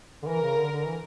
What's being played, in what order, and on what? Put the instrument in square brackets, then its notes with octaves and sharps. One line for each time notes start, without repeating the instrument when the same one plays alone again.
[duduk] D3
[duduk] E3 [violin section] A#4
[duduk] C#3
D3
D3
E3